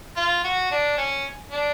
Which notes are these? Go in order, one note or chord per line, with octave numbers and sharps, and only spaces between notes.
F4
F#4
D4
C#4
D4